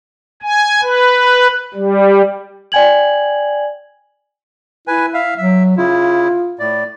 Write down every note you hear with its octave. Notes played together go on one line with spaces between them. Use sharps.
G#5
B4
G3
D5 G5 G#5 G#6 F#7
E4 B4 G#5
E5 F5
F#3 E5
C#3 E4 F4
A2 D5